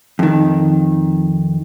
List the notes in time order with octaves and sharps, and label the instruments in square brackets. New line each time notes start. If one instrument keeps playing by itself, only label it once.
[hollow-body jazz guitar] F2 D#3